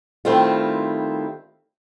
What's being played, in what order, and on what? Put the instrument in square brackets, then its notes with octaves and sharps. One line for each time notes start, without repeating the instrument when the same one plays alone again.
[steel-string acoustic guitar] D#3 G3 A3 C4 E4 F4